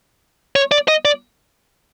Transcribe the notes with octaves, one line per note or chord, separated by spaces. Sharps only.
C#5
D5
D#5
D5